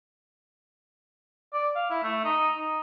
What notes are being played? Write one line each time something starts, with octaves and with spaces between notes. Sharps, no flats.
D5
F5
E4
A3
D#4
D#4